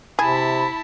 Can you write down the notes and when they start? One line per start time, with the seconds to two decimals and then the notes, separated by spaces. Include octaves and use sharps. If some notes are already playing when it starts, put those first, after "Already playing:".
0.19 C3 E4 G#4 A5 B5